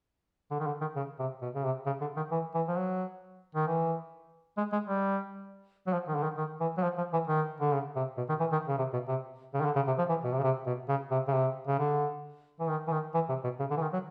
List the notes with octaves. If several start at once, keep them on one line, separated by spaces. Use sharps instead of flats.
D3
D#3
D3
D#3
C#3
C3
B2
C#3
C3
C#3
D3
D#3
E3
E3
F3
F#3
D#3
E3
G#3
G#3
G3
F#3
F3
D#3
D3
D#3
D#3
E3
F#3
F3
F3
E3
D#3
D3
C#3
C3
B2
D#3
E3
D#3
C#3
C3
B2
C3
C#3
D#3
D3
C#3
C3
F3
E3
B2
C3
C#3
C3
B2
C#3
C3
C#3
C3
C#3
D3
E3
D#3
E3
D#3
E3
C3
B2
C#3
D3
E3
D#3
F#3